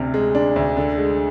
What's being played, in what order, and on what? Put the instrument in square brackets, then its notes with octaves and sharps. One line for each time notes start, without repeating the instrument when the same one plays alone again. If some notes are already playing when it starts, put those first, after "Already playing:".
Already playing: [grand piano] D2 C3 D4 F6
G#3
D4
D2
D3
G#3